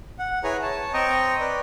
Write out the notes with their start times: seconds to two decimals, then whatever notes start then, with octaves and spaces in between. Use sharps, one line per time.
0.19 F#5
0.44 E4 G#4 B4 C#5 G#5 A#5
0.62 C#5 A5
0.94 C4 D#5 G5 A#5 C#6 D#6
1.40 B4 D5